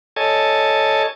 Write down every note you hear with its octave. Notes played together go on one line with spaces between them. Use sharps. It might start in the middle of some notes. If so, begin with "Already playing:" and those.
A4 C#5 D#5 G#5 A5